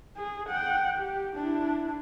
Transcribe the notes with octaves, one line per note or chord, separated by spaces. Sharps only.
G#4
F#5 G5
G4
D4 E4